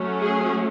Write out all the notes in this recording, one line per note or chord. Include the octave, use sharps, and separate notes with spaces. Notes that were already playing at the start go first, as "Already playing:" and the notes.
Already playing: F#3 A3 C#4
G#4